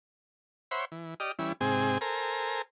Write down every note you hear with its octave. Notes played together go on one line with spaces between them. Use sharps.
C5 C#5 E5 F#5 B5 C6
E3
G4 D5 D#5 D#6 F6
E3 G3 C#4 E4
G#2 C3 C4 G#4 G#5
A4 A#4 C5 G#5 A#5